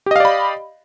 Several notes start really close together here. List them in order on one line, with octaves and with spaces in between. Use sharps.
G4 D#5 F5 D5 B5